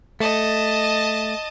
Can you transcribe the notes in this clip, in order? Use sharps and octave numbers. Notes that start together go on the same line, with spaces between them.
A3 D#5 A5